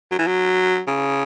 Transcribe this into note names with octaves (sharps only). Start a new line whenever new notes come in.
F#3
E3
F#3
C#3